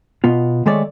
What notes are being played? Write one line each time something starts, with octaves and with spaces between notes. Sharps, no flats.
B2 B3 F4
D#3 G#3 A3 C#5 D5